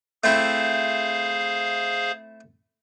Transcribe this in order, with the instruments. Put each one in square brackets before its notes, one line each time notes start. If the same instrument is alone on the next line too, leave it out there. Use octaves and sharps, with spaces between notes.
[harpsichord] A3 C4 E4 [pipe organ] G#4 C5 F5